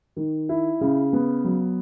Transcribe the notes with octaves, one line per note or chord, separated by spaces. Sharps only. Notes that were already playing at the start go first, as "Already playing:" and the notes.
D#3
E4
C#3
B3
F#3